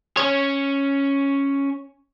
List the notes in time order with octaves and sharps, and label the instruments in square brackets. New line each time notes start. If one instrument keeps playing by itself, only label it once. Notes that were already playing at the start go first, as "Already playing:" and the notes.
[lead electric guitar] C#4 C#5